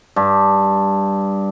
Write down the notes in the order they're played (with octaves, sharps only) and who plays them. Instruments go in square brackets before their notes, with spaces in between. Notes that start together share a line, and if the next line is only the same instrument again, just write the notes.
[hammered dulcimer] G2